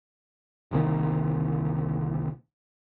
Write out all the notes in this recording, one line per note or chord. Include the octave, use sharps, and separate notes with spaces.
G1 C2 A#2 D#3